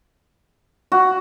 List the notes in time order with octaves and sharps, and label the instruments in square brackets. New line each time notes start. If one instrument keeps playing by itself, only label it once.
[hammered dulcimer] F#4